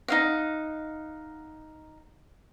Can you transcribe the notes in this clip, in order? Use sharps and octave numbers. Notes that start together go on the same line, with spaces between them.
D#4 F5 F#5